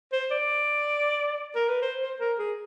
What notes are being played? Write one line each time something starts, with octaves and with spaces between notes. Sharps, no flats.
C5
D5
A#4
B4
C5
C5
A#4
G#4